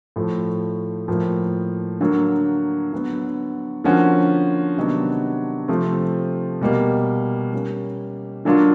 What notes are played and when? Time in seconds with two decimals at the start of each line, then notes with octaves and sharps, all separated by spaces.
0.16 A2 F3 A3
1.08 A2 F3 A#3
2.01 D3 F#3 A#3
2.93 D3 F#3 B3
3.84 D3 F3 A#3 C#4 F#4
4.77 C3 D#3 F#3 B3 D4
5.68 C3 F3 A3 C4
6.61 B2 G3 A#3
7.53 G3 A#3 C#4
8.45 D3 F#3 A#3 D4 F4